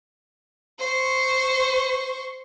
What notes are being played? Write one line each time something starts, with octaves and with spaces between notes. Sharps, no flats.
C5 C#6